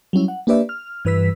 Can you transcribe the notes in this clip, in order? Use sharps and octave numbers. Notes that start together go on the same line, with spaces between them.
F#3 G3 C#4 E4
F#5
A#3 D4 G4 B4 D5 E5
F6
G2 E3 B4 E6 B6